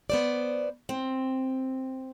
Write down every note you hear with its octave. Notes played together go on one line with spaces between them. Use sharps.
B3 C5 D5
C4